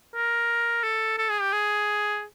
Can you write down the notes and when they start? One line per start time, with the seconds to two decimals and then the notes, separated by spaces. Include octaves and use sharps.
0.14 A#4
0.83 A4
1.18 A4
1.29 G#4
1.41 G4
1.53 G#4